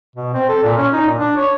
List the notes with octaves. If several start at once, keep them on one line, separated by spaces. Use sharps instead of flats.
B2
C4
A4
A#2
C#4
D#4
A#2
D4
C#5